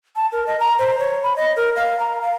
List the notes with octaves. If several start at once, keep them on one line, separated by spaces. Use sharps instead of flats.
A5
A#4
D#5
A#5
C5
C#5
B5
D#5
A#4
F5
A#5
F5